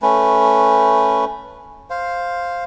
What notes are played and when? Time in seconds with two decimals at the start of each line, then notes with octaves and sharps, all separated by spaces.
0.02 A3 C#4 B4
1.90 C5 F5